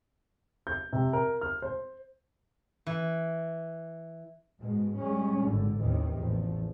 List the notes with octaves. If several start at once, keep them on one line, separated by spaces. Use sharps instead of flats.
G6
C3
A#4
F6
C5
E3
G#2 B2 G#3
G3 G#3 C#4
G#1 A2 D3
A1 D#2 C3 D#3 E3
A1 E2 F3